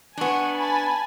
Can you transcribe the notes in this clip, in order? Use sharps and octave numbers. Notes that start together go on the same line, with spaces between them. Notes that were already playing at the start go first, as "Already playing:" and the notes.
B3 D4 G#5 C#6
G#5 A5 B5